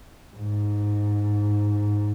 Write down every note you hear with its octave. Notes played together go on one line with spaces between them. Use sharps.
G#2